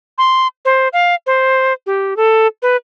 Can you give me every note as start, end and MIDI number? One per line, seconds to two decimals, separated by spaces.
0.18 0.47 84
0.65 0.88 72
0.93 1.15 77
1.26 1.73 72
1.86 2.16 67
2.17 2.47 69
2.62 2.76 71